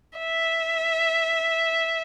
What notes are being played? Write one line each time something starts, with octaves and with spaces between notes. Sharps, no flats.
E5